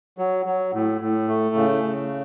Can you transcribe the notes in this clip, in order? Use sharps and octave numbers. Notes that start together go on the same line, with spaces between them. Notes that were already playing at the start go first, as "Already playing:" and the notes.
F#3
F#3
A2
A2
A3
C#3
C#3